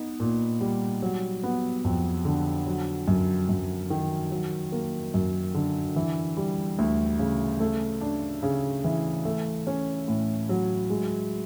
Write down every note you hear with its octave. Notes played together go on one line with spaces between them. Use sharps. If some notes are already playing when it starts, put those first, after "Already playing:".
Already playing: B3 D#4
A#2
G3
F#3
B3
F2
D3
F#3
F#2
F#2
D#3
F#3
A#3
F#2
D3
E3
G3
D2
C#3
A3
D4
C#3
E3
A3
C#4
A2
F#3
G#3